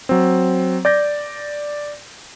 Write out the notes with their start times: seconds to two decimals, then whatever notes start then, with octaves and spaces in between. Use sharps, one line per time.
0.09 F#3 C4
0.85 D5 G6 A#6